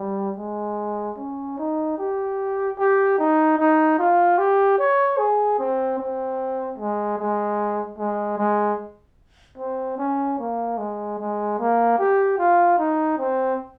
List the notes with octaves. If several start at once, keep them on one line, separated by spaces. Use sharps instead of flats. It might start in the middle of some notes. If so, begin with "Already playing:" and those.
Already playing: G3
G#3
C#4
D#4
G4
G4
D#4
D#4
F4
G4
C#5
G#4
C4
C4
G#3
G#3
G#3
G#3
C4
C#4
A#3
G#3
G#3
A#3
G4
F4
D#4
C4